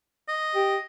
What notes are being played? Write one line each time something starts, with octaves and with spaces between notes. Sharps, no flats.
D#5
G4